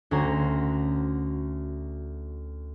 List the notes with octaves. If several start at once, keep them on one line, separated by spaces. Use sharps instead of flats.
D2 C#4 F#4 A#5 C6 G#6